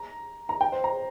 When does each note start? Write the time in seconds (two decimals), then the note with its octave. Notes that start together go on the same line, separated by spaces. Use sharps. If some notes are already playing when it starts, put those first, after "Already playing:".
Already playing: A#5
0.49 A#5
0.61 G5
0.72 C5
0.84 A#5